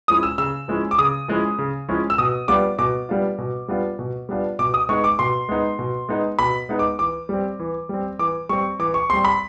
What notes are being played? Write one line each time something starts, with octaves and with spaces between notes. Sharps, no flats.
F3 G#3 C#4 E4 D#6
E6
C#3 E6
F3 G#3 C#4 E4
D6
C#3 D#6
F3 G#3 C#4 E4
C#3
F3 G#3 C#4 E4
E6
B2 D#6
G3 B3 D4 F4 D6
B2 D6
G3 B3 D4 F4
B2
G3 B3 D4 F4
B2
G3 B3 D4 F4
B2 D6
D#6
G#3 B3 D#4 C#6
D6
B2 C6
G#3 B3 D#4
B2
G#3 B3 D#4
B2 B5
G#3 B3 D#4
D6
E3 D6
G3 C4
E3
G3 C4
E3 D6
G3 C4 C#6
E3 D6
C#6
G3 C4 C6
B5